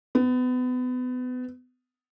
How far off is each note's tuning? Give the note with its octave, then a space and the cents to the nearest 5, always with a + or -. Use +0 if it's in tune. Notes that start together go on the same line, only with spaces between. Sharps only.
B3 +30